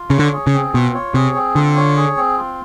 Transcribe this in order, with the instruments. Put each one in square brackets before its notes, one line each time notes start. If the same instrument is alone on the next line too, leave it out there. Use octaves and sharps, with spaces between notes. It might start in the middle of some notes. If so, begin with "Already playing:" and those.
Already playing: [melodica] F4
[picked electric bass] C#3 [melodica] C#5
[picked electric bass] D3
[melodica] G#4
[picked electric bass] C#3
[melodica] C4
[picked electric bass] B2 [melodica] F4
[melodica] C#5
[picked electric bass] C3 [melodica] G#4
[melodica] C4
[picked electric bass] D3 [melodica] F4
[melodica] C#5
G#4
C4
F4